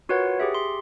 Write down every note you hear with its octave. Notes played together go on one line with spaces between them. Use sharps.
F4 F#4 A#4 B4 C#5 F#5
G4 G#4 E5
C6